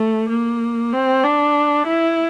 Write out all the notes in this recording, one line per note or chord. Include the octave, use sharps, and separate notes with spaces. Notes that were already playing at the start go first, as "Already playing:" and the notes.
Already playing: A3
A#3
C4
D4
E4